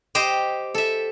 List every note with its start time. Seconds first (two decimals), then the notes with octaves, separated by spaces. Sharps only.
0.15 G4 C5 D#5
0.75 A4 E5